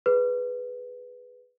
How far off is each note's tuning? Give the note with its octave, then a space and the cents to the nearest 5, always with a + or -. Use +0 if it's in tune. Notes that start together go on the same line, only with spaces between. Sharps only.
G#4 +0 B4 +0